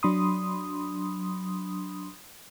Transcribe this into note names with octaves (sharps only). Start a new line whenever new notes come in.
F#3 D4 B5 C6 D#6